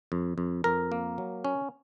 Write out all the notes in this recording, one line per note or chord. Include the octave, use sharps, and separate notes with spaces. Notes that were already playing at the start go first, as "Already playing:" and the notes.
F2
F2
F2 A#4
A#3
F#3
C#4